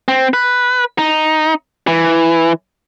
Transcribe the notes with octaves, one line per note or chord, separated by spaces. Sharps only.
C4
B4
D#4
E3